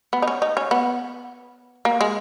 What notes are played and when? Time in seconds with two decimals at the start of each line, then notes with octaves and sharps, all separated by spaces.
0.13 B3
0.22 D#4
0.28 C#4
0.42 D#4
0.57 C#4
0.71 B3
1.85 A#3
2.01 G#3